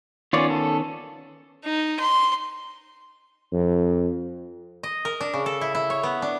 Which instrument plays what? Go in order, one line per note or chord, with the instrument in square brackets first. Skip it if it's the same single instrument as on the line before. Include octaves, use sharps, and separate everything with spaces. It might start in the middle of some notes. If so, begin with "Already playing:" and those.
[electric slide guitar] D#3 B3 C#4 [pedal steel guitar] F4 C#5 D5
[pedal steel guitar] A4
[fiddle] D#4
C6
[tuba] F2
[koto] D#5
A#4
D4
C#3
A4
E4
E4
C#5
B3
D4